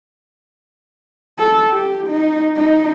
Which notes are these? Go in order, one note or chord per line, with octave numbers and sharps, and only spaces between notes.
A4
G4
D#4
D#4